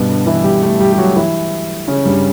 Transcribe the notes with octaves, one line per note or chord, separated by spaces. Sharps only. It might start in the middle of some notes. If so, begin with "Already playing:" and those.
Already playing: G2 B2 G3 B3
D3 D4
E3 E4
G3 G4
A3 A4
G3 G4
G4
F#3 F#4
E3 E4
C#3 C#4
G2 G3